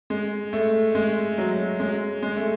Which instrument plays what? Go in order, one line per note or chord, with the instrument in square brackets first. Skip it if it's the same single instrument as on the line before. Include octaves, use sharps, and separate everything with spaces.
[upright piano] G#3
A3
G#3
F#3
G#3
G#3
A3